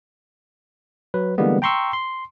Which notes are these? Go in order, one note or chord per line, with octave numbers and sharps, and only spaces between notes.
F#3 B4
D3 E3 G3 G#3 A#3 B3
G5 A#5 C6 C#6 E6
C6